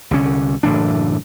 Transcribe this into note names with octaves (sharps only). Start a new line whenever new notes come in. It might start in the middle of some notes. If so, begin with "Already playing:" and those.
C2 D3 C#4
F#1 A2 E3 D4